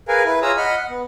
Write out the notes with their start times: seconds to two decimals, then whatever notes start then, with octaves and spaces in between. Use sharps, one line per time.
0.08 G#4 A#4 B4 F5 G#5
0.25 E4 B4
0.42 F4 G#4 C#5 A#5 D#6 E6
0.57 D#5 F#5 B5 F6
0.76 F#5
0.89 B3